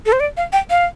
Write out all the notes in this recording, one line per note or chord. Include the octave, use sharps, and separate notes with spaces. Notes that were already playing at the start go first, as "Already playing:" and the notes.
A4
C5
D5
F5
G5
F5